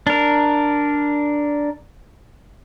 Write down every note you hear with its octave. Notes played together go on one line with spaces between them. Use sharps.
D4 A#4